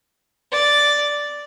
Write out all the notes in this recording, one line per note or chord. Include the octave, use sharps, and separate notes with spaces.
D5